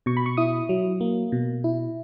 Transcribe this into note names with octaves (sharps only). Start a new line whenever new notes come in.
B2 C#6
B5
C#6
E4 D#6
F#3
A#3
B2
E4